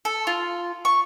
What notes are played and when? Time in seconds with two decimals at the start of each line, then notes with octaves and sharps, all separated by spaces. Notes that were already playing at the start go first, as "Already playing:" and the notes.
0.05 A4
0.27 F4
0.85 C#6